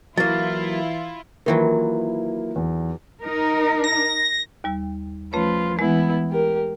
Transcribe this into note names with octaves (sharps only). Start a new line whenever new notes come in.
E3 F#3 A#3 E4 F4 A6
D#3 E3 F#3 A#3 E4 F4
E2
D#4 A#4
A#6
D#2 G3 E6
F3 A3 C#4 F4 B4 C#5
E3 G#3 B3 E4
G4 A#4